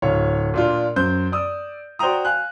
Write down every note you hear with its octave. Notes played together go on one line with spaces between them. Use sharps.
D1 C#5 F5
A#2 D4 F4
F#2 C5 G6
D5 D#6 E6
F#4 C5 D5 G5 A#5 D#6
F5 G#5 F#6